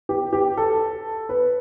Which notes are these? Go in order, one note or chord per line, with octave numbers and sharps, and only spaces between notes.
G4
G4
A4
B4